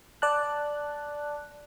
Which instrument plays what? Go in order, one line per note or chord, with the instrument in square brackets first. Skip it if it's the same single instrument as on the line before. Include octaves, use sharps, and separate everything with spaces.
[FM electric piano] D5 A5 F#6